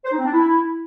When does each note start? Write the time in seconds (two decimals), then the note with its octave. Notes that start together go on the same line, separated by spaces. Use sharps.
0.05 C5
0.12 D#4
0.19 C4
0.25 D4
0.32 E4